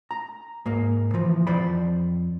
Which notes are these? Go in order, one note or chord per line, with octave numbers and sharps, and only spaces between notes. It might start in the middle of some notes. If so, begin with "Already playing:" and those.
A#5
G#2 A#3
E3 F3
F2 C5 D5 B5